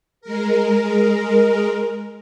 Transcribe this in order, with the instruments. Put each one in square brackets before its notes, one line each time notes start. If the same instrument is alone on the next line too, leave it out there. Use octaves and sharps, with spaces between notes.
[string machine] G#3 A#4